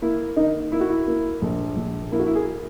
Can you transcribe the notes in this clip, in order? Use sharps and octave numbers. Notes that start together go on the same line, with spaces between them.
A#3 E4
D#3 D#4
A#3 E4
F#4
E4
A#3
A#1
A#1
A#3 E4
F#4
E4
G#4